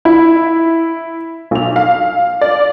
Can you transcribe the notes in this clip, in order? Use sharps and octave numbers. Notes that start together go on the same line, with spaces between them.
E4
B1 F7
F5
D5